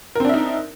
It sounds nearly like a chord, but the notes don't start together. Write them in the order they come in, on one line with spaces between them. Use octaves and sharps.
A#4 C4 D4 E5 D#4